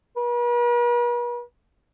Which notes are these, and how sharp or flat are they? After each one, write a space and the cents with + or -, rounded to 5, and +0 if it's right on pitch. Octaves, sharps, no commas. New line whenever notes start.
B4 -45